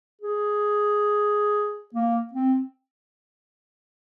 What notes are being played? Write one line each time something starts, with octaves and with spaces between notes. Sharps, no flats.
G#4
A#3
C4